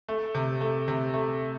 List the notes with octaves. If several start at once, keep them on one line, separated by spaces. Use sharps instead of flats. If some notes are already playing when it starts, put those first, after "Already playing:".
A3
C3
A3
C3
A3